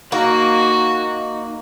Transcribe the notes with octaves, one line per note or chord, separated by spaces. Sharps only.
A#3 D#4 F#4